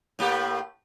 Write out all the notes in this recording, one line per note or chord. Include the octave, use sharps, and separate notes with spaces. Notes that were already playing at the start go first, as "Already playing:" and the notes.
A2 A#3 G4